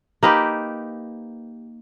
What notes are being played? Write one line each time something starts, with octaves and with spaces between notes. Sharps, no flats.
A#3 D#4 G4 B4